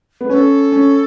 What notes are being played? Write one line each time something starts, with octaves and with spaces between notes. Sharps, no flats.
B3
C#4 A4 C#5
C#4